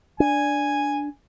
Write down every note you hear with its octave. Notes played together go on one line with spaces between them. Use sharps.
D4 G#5